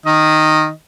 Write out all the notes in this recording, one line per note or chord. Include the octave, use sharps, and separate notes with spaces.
D#3 D#5